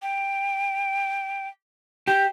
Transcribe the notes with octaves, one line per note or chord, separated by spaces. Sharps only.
G5
G4 G6